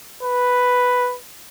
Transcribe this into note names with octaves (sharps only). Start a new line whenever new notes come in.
B4